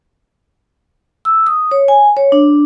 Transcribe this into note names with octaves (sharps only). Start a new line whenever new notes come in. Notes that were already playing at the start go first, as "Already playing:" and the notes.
E6
D#6
C#5
G#5
C#5
D4